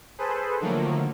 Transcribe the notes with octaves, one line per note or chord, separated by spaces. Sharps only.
G#4 A4 B4 C5
D3 D#3 F3 F#3 A3 A#3